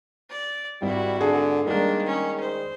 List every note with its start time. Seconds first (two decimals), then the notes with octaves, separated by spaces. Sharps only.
0.30 D5
0.82 G#1 G3 E4 F#4
1.21 D3 G#4
1.67 D#3 G3 G#3 A#3 D4
2.06 C#4
2.40 C5